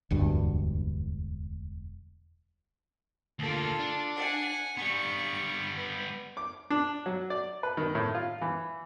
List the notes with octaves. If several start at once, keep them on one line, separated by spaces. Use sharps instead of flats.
E1 D2 G2
D2 A#3 F4 A4
D4
F#5 G#5
G3 B3 C#6
B4
D6
D4
F#3
D5
B4
D#3
A2
F4
E3